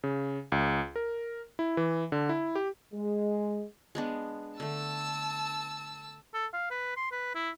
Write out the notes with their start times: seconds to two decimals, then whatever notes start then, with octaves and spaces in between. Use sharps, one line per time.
0.04 C#3
0.52 C#2
0.96 A#4
1.59 E4
1.77 E3
2.12 D3
2.29 E4
2.55 G4
2.94 G#3
3.95 G#3 B3 D4
4.60 D3 A3 A5 E6
6.34 A4
6.54 F5
6.71 B4
6.97 C6
7.12 B4
7.35 E4